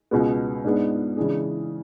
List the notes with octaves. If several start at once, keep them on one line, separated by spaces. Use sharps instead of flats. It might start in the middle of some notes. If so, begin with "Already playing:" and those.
C#2 B2 G#3 B3
G#2 G#3 B3 D4
C#3 E3 G#3 D4 G#4